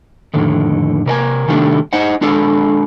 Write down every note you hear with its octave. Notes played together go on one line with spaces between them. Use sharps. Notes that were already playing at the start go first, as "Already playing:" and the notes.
F2 A2 D3 D#3
C3 A#4 D5 G#5
C3 D#3 G3 A3 D4
D#4 C5 D#5 F#5
G#3 D4 F4 A4 D5